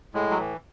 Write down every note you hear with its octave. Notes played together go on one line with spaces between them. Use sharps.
A2 G#3
F#3
E3